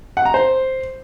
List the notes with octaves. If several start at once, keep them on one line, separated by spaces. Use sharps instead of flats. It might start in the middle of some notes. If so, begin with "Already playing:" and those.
F#5
A#5
C5